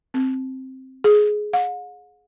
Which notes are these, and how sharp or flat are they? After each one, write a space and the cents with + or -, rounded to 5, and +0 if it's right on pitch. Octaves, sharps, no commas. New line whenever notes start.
C4 +5
G#4 +15
F#5 -45